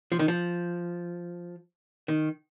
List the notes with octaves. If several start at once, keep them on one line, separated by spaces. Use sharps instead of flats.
F3
D#3
F3
D#3